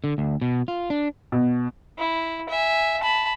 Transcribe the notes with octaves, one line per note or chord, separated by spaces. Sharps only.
D3
D2
B2
F4
D4
B2
E4
E5 G#5
A5 B5